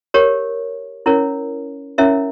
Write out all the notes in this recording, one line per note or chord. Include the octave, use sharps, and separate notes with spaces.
G4 A#4 C#5
C#4 E4 A#4 C#5
C#4 E4 A#4 C#5 E5